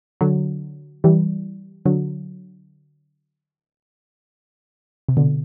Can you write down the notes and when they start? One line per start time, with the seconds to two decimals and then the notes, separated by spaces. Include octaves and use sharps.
0.21 D3 F#3
1.04 E3 G3
1.86 D3 F#3
5.09 C3
5.17 B2 D3